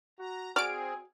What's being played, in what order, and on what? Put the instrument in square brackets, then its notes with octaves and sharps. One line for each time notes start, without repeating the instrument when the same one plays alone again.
[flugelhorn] F#4 [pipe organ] A#5
[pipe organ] C4 G#4 [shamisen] F#4 D5 [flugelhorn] G#5 [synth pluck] F6 D7